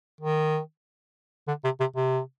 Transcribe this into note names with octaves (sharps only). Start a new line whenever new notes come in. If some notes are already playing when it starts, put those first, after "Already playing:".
D#3
D3
C3
C3
C3